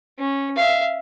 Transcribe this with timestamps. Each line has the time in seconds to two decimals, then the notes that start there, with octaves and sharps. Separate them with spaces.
0.18 C#4
0.56 E5 F5